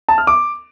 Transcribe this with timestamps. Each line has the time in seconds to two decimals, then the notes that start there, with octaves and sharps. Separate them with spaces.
0.09 A5
0.18 F6
0.27 D6